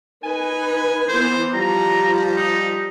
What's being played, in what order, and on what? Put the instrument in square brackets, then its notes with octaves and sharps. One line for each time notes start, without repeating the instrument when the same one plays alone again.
[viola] D#4 B4 [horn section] G#5
[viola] E3 B3 [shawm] C5
[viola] F3 [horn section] G3 [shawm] A#5
[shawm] D#4